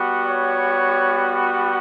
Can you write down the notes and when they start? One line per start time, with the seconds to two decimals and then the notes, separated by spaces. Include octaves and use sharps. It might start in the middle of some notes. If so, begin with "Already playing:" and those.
Already playing: G3 B3 F#4
0.22 C#5